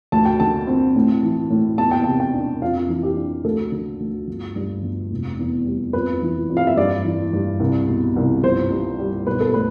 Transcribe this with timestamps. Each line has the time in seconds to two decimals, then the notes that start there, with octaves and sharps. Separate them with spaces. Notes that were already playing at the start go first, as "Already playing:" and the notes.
0.12 D2 A5
0.25 G5
0.40 D3 A5
0.67 C4
0.96 A2
1.23 E3
1.50 A2
1.78 E2 A5
1.91 G5
2.04 C3 A5
2.20 G5
2.33 D4
2.62 F2 F5
2.88 E3
3.03 G4
3.17 D4
3.44 D2 A4
3.72 D3
4.00 D2
4.27 G1
4.56 G2
4.83 G1
5.11 F1
5.39 E2
5.66 G3
5.93 F2 B4
6.22 E3
6.50 F2
6.57 F5
6.67 E5
6.77 G2 D5
7.05 E3
7.33 G2
7.60 C2
7.88 B2
8.16 C2
8.43 G1 C5
8.71 G2
8.98 G3
9.26 B1 B4
9.41 A4
9.54 A2 B4